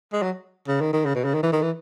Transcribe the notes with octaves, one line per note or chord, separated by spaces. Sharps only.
G#3
F#3
C#3
D#3
D#3
C#3
B2
C#3
D#3
E3
D#3
E3